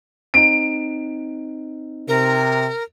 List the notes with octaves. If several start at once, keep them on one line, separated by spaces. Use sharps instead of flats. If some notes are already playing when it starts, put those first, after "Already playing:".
C4 D#4 D7
C3 A#4